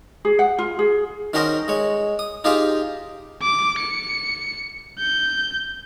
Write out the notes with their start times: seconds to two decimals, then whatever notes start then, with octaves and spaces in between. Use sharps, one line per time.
0.25 G#4
0.39 F#5
0.59 F4
0.79 G#4
1.33 D#3 C#4 F#4 A#4 C5 D#5
1.68 G#3 C#5
2.19 D#6
2.44 D#4 F4 G4 G#4 C5 F5
3.42 D6
3.79 C#7
4.99 G6